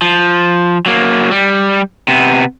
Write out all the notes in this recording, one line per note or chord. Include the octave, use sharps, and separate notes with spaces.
F3
F#3 A#3
G3
C3 B3